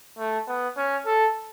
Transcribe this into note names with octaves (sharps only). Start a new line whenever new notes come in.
A3
B3
C#4
A4